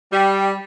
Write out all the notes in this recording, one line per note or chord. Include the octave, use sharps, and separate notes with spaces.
G3